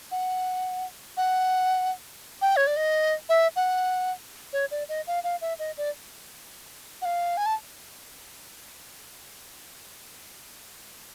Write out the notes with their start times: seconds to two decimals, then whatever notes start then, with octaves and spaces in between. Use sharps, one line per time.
0.11 F#5
1.17 F#5
2.42 G5
2.57 C#5
2.67 D5
2.77 D#5
3.29 E5
3.56 F#5
4.53 C#5
4.71 D5
4.89 D#5
5.07 F5
5.24 F5
5.41 E5
5.59 D#5
5.77 D5
7.02 F#5
7.05 F5
7.37 G#5
7.46 A5